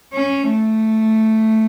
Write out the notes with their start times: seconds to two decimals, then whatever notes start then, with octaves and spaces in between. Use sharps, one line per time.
0.14 C#4
0.50 A3